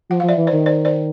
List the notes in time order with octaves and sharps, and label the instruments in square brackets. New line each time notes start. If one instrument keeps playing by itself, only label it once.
[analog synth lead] F3 [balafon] F#5
[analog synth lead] F3 [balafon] F5
[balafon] D5 E5
[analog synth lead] E3
[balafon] C5 D5
[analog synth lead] D#3
[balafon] C5 D5
C5 D5